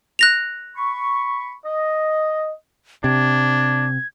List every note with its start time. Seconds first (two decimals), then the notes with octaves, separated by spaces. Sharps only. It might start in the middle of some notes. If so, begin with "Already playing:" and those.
0.19 F#6 A#6 F7
0.76 B5 C#6
1.65 D#5
3.04 C3 D4 G#6